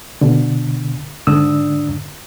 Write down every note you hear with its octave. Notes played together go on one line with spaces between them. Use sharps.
B2 D3
G#2 D3 D4 D#6 E6